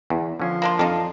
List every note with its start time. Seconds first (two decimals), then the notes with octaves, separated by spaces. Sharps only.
0.10 E2
0.40 D3 F3 C#4
0.62 A#3 D4 F4
0.79 F2 D4 D#4